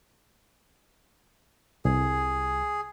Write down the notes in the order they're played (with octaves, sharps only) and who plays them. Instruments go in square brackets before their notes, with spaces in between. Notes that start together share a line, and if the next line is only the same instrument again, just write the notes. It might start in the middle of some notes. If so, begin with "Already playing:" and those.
[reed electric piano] C2 [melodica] G#4